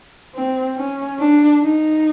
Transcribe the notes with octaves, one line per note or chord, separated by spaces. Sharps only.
C4
C#4
D4
D#4